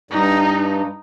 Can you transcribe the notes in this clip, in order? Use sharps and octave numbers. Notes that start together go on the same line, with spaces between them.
G2 D#4